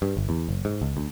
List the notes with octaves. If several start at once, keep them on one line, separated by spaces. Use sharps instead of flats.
G2
G1
E2
F#1
G#2
C#2
D2